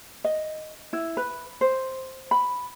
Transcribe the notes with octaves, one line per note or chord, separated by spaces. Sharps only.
D#5
E4
B4
C5
B5